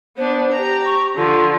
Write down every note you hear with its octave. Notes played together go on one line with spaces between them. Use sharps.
B3 D4 C5
G4 A#5
C#6
D3 F3 F4